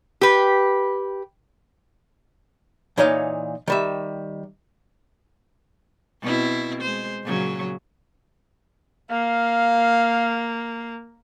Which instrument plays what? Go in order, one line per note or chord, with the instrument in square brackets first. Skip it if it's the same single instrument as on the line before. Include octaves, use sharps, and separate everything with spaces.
[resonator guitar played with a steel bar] G4 B4
[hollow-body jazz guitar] A#2 E3 D#4 C#5 D#5 F5
D#3 G3 E5
[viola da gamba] B2 C4 E4
G#3 C5
A#2 C#3 F#3
[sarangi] A#3 [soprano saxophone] F5